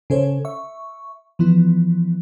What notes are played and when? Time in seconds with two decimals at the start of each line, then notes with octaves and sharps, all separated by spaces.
0.10 C#3 C#4 A4 C5 C#5
0.45 E5 C#6
1.39 E3 F3 B3 E4